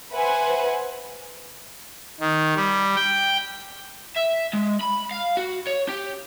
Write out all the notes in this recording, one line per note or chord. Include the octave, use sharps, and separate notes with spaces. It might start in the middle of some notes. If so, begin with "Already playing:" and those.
B4 C5 E5 F#5 G#5
D#3
G3
G5
E5
G#3
B5
F5
F#4
C#5
G4